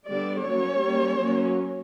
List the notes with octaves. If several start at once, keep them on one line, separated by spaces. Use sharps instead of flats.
D3 G3 B3 D4 D5
F#3 A#3 C#4 C#5
G3 A#3 C#4
F#3 A#3 C#4